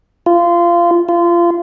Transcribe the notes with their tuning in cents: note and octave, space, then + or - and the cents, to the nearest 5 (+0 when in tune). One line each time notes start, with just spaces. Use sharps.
F4 -20
F4 -25